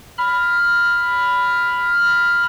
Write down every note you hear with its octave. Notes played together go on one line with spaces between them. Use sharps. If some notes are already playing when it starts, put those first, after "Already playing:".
B5 F6